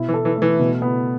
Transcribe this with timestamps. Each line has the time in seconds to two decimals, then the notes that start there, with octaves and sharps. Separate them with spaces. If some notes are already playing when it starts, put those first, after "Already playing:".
Already playing: B2 E4
0.08 E3
0.14 A4
0.25 E3
0.36 A3
0.42 E3
0.59 B2
0.82 B3